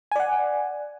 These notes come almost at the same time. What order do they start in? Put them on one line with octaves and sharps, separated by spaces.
G#5 D5 F#5